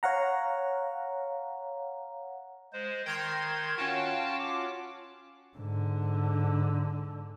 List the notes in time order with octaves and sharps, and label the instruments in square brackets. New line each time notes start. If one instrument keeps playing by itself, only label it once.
[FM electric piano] C#5 F5 F#5 A#5
[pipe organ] G#3 C5
[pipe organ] D#3 G#6 [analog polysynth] G5 A#5 C6
[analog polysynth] C#4 F4 F#4 [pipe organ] F5 G5 A5
[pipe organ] D6
[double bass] G#2 D3